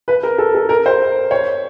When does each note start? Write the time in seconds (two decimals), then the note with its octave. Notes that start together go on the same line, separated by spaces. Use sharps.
0.08 B4
0.23 A#4
0.38 A4
0.55 A4
0.69 A#4
0.86 C5
1.31 C#5